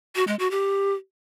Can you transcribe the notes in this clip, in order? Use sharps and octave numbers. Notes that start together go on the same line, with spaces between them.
F#4
G#3
F#4
G4